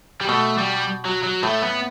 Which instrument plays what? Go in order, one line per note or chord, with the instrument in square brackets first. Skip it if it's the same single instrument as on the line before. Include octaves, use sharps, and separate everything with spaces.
[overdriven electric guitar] G3
[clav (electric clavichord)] B2 [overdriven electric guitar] A3
[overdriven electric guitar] G3
F#3
F#3
[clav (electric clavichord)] A2 [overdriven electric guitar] A3
[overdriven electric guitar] B3